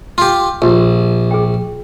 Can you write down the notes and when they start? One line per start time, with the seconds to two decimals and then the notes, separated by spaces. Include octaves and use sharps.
0.18 F4 G4 C6
0.62 A#1 F4 G4 B5
1.31 G#4 G5